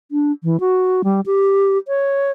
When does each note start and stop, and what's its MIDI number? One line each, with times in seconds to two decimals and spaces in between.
0.11 0.32 62
0.44 0.60 52
0.60 1.02 66
1.04 1.21 55
1.26 1.78 67
1.88 2.31 73